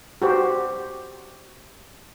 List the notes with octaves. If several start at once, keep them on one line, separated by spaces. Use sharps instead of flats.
F#4 G4 C5